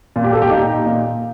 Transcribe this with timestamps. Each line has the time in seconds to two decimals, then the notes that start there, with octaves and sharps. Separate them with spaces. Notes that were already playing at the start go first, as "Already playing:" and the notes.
0.16 A#2
0.24 G4
0.33 A4
0.42 G4
0.50 A#2 D#4
0.86 A#2